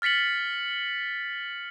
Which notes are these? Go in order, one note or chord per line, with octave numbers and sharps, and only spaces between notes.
F6 A6 B6 C#7 F#7